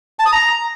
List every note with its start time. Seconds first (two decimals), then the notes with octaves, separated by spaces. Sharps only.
0.19 A5
0.26 D#6
0.32 A#5